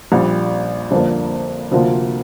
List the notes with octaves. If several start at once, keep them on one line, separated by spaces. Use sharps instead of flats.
A#1 A#2 G3
G1 F2 F3 A#3 D4
D2 C3 F3 A#3 F4